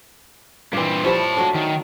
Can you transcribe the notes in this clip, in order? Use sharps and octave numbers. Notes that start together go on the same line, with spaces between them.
G2 A#2 E3 C4
F3 G3 E4 C#5 A5
F#3 A3 D4
D#3